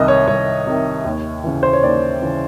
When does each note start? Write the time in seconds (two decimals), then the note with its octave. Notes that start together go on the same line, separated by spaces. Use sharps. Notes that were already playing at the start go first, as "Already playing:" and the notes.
Already playing: C2 C3 D#3 D#5
0.08 C#5
0.27 C2 C#5
0.66 C3 D#3
1.05 D#2
1.44 C#3 E3
1.63 C5
1.73 C#5
1.83 D#2 D5
2.22 C#3 E3